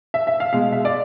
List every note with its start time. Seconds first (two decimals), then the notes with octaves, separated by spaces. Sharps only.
0.14 E5
0.27 E5
0.40 F5
0.53 B2 G#3 F5
0.72 E5
0.85 D5